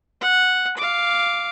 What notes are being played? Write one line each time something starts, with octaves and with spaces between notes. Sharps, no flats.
F#5
F5 D6